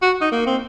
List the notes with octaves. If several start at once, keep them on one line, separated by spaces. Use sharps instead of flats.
F#4
D#4
A#3
C4